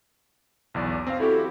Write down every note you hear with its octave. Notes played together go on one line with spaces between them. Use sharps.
B1 E2 D5
C4 F5
E4 F#4 G4 A4